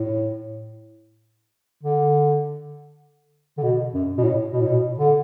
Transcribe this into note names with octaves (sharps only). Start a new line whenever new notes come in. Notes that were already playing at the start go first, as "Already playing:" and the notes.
Already playing: A2
D3
D3
B2
F#2
B2
A2
B2
A2
B2
D3